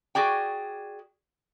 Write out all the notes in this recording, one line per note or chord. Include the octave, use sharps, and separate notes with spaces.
F#4 G#4 D5 G5